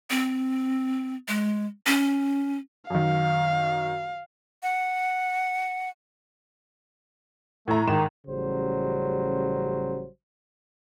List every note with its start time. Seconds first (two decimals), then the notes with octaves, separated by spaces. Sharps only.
0.10 C4
1.28 G#3
1.86 C#4
2.90 F#2 D#3 F5
4.63 F#5
7.68 A2 A3 A#5
7.87 G#2 D#3 E7
8.27 A1 C#3 F#3 G3 C5